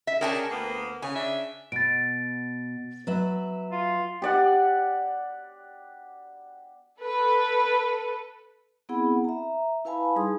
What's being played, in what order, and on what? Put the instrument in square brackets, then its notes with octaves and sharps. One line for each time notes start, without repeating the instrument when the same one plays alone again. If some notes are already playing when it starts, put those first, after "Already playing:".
[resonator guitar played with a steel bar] E5
[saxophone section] C#4 D4 G#4 [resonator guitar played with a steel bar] A#4 G5 A5
[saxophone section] D2 A#3 B3
[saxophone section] C#3 [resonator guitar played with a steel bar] G#5
[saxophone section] C#3 D4 E5
[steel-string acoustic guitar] B2 [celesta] A6 D7
[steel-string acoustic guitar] F#3 B4 E5
[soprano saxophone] F4
[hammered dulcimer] G4 D5 F#5
[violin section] A4 B4
[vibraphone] B3 C4 E4 G#4 F#5 B5
E5 A#5
E4 B4 F5 G#5 A5 B5
G3 D#4 G#4 C6 D#6